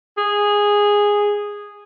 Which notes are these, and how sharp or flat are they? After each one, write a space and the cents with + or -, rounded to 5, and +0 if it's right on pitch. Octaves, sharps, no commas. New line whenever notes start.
G#4 -10